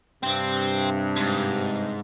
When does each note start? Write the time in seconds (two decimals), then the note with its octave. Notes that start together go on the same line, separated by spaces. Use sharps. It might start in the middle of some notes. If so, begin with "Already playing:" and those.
0.23 G2 C3 C4
1.17 G#2